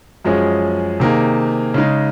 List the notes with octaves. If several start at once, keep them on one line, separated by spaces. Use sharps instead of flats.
F#2 F3 G#3 C#4 G#4
C3 D#3 A#3 D#4 G#4
C#3 G#3 D#4